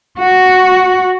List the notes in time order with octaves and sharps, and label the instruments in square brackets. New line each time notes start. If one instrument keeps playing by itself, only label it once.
[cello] F#4